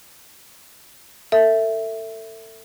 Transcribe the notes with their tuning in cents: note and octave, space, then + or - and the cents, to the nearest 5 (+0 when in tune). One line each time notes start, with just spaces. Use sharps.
A4 +30 E5 +0